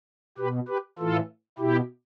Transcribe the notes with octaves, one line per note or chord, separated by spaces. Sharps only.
B2 G4 B4
G4 B4
A2 E3 F4 A4
B2 E4 G4